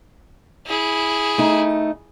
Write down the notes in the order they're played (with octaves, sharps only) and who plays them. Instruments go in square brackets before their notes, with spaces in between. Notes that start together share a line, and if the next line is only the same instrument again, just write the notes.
[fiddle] E4 G#4
[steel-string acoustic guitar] A3 D#4